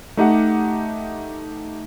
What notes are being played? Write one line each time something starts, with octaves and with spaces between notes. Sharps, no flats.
A3 D#4 G4 F#5